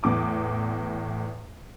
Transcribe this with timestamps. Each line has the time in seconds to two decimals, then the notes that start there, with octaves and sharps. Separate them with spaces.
0.03 E2 A2 D6 D#6